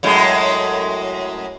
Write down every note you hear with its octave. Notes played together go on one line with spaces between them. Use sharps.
F#2 A2 G#3